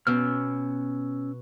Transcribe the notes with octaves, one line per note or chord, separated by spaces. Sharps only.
B2 C#4 E6 F6